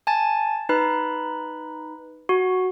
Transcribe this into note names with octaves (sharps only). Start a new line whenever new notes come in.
G#5 A5 A6
D#4 B4 B5
F#4